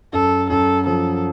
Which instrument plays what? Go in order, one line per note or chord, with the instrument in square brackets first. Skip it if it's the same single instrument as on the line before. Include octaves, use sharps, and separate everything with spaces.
[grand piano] F#2 [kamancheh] A4
[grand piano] F#2 [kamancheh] A4
[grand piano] F3 [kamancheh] A4